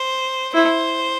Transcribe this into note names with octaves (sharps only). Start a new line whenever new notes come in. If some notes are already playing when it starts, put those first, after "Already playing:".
Already playing: C5
E4 C5